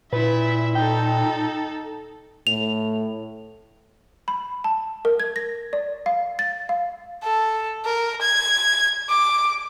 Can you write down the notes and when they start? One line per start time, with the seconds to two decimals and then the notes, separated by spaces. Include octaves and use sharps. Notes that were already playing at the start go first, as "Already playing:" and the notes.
0.13 A#2 E4 B4 E5
0.75 D#4 A4 G5
2.47 A2 F7
4.28 B5
4.64 A5
5.05 A#4
5.20 G#6
5.36 A#6
5.73 D5
6.06 F5
6.39 A6
6.69 F5
7.23 A4
7.85 A#4
8.22 G#6
9.09 D6